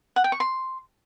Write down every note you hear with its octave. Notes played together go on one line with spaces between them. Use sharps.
F#5
G5
C#6
C6